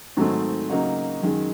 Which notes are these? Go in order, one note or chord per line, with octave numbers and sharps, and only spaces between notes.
G#2 D#3 F#3 A3 C4
C#3 F#3 A#3 D#4 F#4
F#2 D#3 G#3